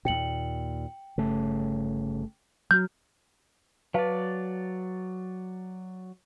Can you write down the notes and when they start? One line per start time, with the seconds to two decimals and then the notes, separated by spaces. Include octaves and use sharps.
0.05 D#2 A#2 G5 C#7 F#7
1.18 G1 C#3 A3
2.71 F#3 F#4 F6 G6
3.94 F#3 B4 D5 F5 A5